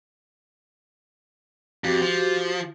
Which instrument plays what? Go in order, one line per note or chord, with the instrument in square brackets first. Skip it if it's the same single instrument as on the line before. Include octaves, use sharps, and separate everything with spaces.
[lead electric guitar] F2 [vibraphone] F#4 G4 D6
[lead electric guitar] F3